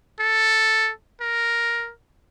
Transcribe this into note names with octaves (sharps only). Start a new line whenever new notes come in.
A4
A#4